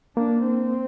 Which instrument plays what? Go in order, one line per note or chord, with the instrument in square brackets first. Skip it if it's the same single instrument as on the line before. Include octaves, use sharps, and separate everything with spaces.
[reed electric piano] A#3 [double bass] D4
[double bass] C4